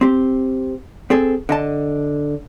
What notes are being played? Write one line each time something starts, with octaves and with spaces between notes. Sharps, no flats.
C4 G4
C4 G#4 A4
D3 D#5 A5